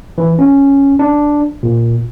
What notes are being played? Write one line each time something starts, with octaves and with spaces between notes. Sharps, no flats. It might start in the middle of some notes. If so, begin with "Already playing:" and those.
E3
C#4
D4
A#2